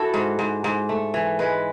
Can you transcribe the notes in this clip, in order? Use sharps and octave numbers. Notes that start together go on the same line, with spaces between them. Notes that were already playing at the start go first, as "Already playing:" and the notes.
Already playing: E4 F#4 A4
G#2
G#2
G#2
A3
E3
G#3 B4